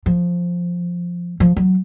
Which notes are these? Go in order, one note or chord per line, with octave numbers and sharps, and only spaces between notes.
F3
F3
F#3